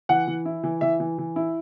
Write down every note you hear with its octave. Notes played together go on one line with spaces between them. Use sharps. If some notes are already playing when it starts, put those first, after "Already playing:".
E3 F#5
E3
E4
E3
E3 E5
E3
E3
E4